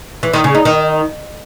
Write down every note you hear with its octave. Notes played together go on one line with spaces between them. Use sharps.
E3
D#3
C#3
D#4
D#3